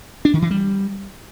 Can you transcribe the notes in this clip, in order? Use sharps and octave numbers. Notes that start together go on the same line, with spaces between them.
D4
D#3
E3
G3